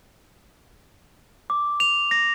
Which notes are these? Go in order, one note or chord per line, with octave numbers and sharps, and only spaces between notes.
D6
F7
A#6